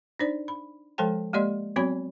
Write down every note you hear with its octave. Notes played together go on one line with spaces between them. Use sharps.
D4 D#4 C5 D5
B5
F3 G#3 A4 C5 G5 A5
G#3 A#3 G4 D5 D#5 C6
F#3 B3 C4 F#4 C#5 B5